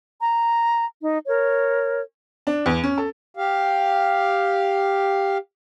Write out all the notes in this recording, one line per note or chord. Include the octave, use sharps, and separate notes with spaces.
A#5
D#4
A#4 C#5
D4
E2
C#4
A4
G4 F5